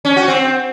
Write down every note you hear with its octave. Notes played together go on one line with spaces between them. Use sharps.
C#4
F#4
C4